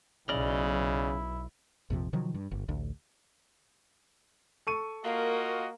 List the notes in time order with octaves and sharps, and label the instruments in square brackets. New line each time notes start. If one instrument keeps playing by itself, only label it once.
[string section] B1 [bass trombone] C#3 [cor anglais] E4 [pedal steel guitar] D5 D#5 F6
[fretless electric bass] A#1 F2 C3 F3
C3 D#3 F3 F#3
G2
G1
A1 D2
[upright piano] A4 C#6 D#7
[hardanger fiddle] A#3 [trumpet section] F4 F#4 D#5 [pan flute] A#4